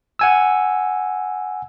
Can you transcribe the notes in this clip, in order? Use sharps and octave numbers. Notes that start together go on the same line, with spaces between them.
F#5 G#5 E6